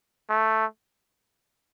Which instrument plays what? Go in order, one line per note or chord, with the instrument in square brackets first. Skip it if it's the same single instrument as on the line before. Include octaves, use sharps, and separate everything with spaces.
[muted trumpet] A3